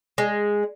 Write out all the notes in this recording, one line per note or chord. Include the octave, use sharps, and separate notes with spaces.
G#3